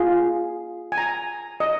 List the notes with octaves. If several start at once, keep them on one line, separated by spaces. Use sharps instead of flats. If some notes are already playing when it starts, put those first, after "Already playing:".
Already playing: F4 G#4
G#5
A#5
D#5